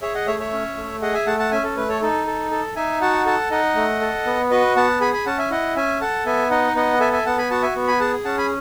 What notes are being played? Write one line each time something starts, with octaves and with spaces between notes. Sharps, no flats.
G#4 C#5 E5
D#5 F#5
A3 C#5 E5
C#5 E5
C#4
A3
G#4 D#5 F#5
E5 G#5
A3 F#5 A5
F#5 A5
C#4 E5 G#5
A4
A3 B4
A4 C#5
D#4 A4
A4
A4
D#4 E5 G#5
F#4 F#5 A5
A4 F#5 A5
D#4 D#5 F#5
A3
A4
B3
F#4 B4 D#5
B3 F#5 A5
G#4 G#5 B5
G#5 B5
C#4 F#5 A5
E5 G#5
E4 D#5 F#5
C#4 E5 G#5
A4 F#5 A5
B3 E5 G#5
D#4 D#5 F#5
B3 D#5 F#5
A4 E5 G#5
E5 G#5
B3 F#5 A5
G#5 B5
F#4 F#5 A5
E5 G#5
B3
G#5 B5
G#4 F#5 A5
C#4 F#5 A5
G#5 B5